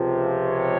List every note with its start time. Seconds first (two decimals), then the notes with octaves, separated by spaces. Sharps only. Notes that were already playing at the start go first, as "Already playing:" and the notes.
Already playing: C#2 C3 F3
0.44 C#5